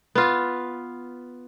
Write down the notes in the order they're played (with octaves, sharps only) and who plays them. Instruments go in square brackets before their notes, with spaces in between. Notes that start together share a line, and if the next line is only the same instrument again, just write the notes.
[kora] B3 F4